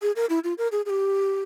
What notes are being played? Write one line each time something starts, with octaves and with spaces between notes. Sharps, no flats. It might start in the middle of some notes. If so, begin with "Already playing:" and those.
G#4
A#4
E4
F4
A#4
G#4
G#4
G4